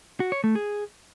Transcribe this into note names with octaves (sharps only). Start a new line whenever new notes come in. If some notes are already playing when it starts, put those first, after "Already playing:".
F#4
C#5
A3
G#4